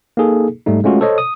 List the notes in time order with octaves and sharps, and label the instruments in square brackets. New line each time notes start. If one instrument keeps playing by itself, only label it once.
[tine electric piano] A#3 D#4 G#4 A4
G#2 G3 A3 D#4
G#3 A3 C#4 F4 F#4
A4 C5 C#5 D#5
D#6